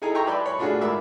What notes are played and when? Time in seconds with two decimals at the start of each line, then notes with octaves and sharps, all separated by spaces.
0.02 D#4 E4 G#4 A4 G#5 A#5
0.15 E5 G5 A#5 C6 C#6
0.26 B4 D5 E5 A5 B5 C6
0.46 C#5 B5
0.59 A3 D4 F4 F#4 G#4
0.81 G#2 A#4 E5 B5 D6